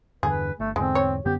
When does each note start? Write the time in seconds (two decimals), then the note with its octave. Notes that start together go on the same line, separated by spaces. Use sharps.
0.23 E2 G2 D3 G#4 B4
0.60 G1 A3
0.76 E2 G#2 D3 G#3 C4
0.95 C#5
1.25 F#2 D3 B3 G4